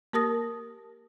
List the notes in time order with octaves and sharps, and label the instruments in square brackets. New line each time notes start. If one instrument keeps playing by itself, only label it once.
[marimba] A#3 G4 A#4 A5 D#6 A#6